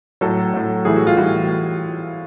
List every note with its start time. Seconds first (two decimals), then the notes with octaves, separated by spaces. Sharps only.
0.21 A2 F#3 A4
0.54 A2 F#3
0.85 A2 E3 G3 G#4
0.96 F#4
1.07 F4
1.17 A2 E3 G3 F#4